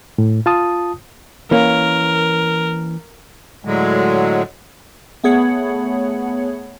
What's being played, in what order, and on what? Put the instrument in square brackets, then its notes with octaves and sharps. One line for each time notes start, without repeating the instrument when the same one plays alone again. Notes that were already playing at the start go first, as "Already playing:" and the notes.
[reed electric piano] A2
F4 A5 D#6
[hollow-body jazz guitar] E3 A#3 C#4 [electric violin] A#4
[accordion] A2 D3 F#3 G#3
[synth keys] A3 B3 G#4 C#5 F#5